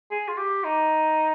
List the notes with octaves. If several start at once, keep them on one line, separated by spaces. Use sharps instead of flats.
G#4
F4
G4
D#4